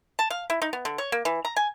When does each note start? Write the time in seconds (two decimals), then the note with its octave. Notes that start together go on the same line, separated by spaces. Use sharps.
0.19 A5
0.30 F5
0.50 E4
0.62 D#4
0.73 B3
0.85 D3
0.98 C#5
1.12 A#3
1.25 E3
1.45 A#5
1.56 G#5